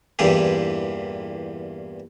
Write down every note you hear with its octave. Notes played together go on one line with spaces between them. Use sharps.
E2 G2 A#2 E3 G4